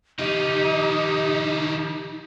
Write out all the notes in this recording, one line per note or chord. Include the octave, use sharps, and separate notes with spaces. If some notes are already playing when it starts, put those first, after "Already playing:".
D#3 F3 D#4 G4